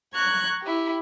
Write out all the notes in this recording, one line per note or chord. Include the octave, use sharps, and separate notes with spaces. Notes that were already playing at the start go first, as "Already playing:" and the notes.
A#5 C#6 F#6 G#6
E4 G4